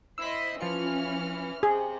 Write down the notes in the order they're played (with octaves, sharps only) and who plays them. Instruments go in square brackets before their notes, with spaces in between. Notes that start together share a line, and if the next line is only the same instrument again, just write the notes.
[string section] E4 C5 D#5 [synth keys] E6 B6
[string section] E3 C#4 F6 [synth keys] F3 F4 C#7
[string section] C3 [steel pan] G#4